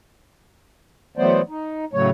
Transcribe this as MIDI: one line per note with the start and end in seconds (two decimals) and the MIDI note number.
1.17 1.42 52
1.17 1.42 54
1.17 1.42 57
1.17 1.42 59
1.17 1.42 72
1.17 1.42 74
1.49 1.85 63
1.93 2.10 45
1.93 2.10 49
1.93 2.10 54
1.93 2.10 57
1.93 2.10 73